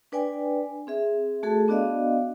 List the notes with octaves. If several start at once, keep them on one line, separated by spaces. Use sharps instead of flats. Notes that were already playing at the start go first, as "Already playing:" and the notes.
D4 B4 D5 G5 G#5
C4 G#4 E5
A3 F#4 G#4 A4 A5
B3 D4 F#4 D5 D#5 F5